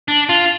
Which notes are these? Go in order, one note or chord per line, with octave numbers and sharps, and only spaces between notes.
D4
F4